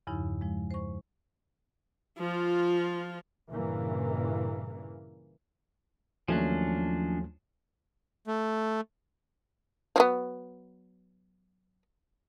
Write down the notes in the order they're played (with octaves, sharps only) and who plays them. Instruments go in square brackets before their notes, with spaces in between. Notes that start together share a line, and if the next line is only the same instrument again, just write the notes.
[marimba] E2 G2 C#3 F3 D#4 E4
F3 G#3
C5 C#6
[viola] F3 F4
[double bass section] G2 A#2 C#3 E3 A#3
[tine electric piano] D#2 F#3 A3 [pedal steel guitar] F3 C#4 D4
[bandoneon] A3
[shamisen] F3 F#3 B3